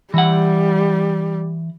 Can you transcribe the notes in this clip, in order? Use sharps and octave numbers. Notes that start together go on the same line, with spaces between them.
E3 G3 F#5